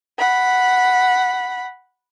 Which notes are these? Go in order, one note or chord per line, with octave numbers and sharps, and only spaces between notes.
F#5 B5